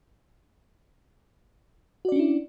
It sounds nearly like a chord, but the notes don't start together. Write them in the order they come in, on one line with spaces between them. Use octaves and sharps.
F#4 D5 C#4 D4 E4